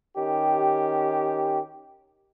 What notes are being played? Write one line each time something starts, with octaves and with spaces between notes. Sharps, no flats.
D#3 C#4 G4